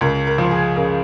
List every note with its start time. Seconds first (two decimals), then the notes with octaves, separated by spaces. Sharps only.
0.01 C#2 A#4
0.27 A#4
0.38 F3
0.51 G#4
0.76 C#3 A#4